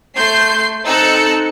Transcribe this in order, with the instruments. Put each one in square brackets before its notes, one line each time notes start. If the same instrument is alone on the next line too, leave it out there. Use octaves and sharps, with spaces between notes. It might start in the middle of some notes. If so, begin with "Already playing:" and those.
[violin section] A3 C6 G6 C7
C4 D#4 A4 E6 F#6 C#7